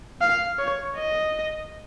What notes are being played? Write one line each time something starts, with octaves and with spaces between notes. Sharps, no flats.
F5
C#5
D#5